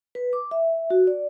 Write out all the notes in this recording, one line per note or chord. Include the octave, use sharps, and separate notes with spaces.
B4
D6
E5
F#4
D5